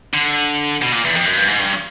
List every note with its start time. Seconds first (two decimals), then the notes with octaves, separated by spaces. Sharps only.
0.14 D3
0.82 B2
0.92 A#2
1.04 E2
1.15 F2
1.25 F#2
1.37 G2
1.47 G#2
1.59 G2